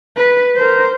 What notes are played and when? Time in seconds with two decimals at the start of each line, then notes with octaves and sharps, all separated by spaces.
0.16 B4
0.56 A#4 C5